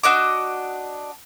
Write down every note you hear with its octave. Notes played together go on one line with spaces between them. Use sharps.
D4 F#4 D#5 D6